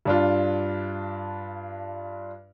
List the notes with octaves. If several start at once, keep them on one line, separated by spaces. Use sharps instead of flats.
G2 D4 F4